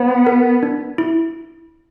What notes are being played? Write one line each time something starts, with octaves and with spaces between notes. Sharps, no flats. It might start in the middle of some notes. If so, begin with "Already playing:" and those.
Already playing: B3 C5
A#4
D4
E4